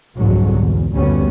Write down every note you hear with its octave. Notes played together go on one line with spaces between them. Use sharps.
C2 F2 G#2 D3 F#3
E2
F#1 D2 G3 B3 C#4